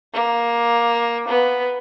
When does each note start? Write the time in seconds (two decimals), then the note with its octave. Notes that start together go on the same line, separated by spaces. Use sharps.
0.14 A#3
1.29 B3